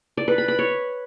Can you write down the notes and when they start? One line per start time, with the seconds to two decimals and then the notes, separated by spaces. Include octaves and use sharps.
0.17 D5
0.28 B4
0.38 B5
0.48 B5
0.59 C#5